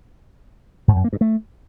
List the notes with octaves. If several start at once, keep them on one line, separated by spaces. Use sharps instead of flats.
G#2
F#2
A#3
G2
A3